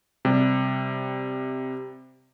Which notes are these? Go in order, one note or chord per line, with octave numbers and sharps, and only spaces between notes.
C3 G3